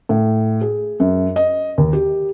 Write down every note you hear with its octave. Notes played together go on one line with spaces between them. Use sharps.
A2
G#4
F#2
D#5
D#2
G4